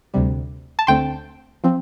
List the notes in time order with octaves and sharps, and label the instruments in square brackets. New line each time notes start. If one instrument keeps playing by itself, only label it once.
[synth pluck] D2 C3 G3
A5
D2 D3 A3 C4 G5 C6
F3 C4